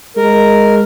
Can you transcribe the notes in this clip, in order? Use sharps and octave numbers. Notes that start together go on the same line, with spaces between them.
G#3 A#4